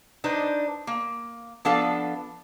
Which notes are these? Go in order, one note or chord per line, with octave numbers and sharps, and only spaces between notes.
D4 D#4 B4 C5
A#3
F3 B3 D4 A4 F5